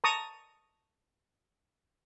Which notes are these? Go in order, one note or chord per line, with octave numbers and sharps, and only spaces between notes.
A5 A#5 C#6 D#6